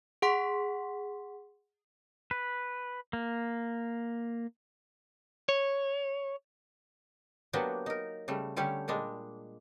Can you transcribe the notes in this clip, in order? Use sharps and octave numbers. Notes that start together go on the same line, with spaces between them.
G#4 F#5 C6 B6
B4
A#3
C#5
F#3 A#3 B3 D4 F#4 G4
D#4 A#4
C#3 G3 A3
D3 G3 A3 C#4 G4 C#5
A#2 G3 G#3 D4